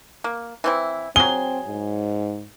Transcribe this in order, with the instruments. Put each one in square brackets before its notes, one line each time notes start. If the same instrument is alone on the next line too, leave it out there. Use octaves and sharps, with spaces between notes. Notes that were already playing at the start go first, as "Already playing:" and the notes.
[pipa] A#3
E3 C4 E4
[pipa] F#3 G#4 [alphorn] C4 [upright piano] G7
[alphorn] G#2